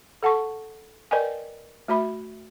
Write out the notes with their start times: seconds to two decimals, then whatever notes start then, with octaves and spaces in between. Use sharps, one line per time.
0.23 A4 F#5 A5 C#6
1.11 A#4 B4 D5 D#5 G5 G#5
1.88 A3 F#4 E5 B5